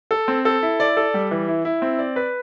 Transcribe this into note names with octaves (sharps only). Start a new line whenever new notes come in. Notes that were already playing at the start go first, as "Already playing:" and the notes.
A4
C4
A4
E4
D5
A4
G3
E3
E4
E4
C4
D5
B4